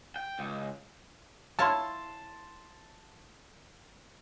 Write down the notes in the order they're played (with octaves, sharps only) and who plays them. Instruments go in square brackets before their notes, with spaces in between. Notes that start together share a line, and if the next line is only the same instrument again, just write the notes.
[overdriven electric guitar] G5
C#2
[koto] E4 F4 C#5 [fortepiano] A5 C6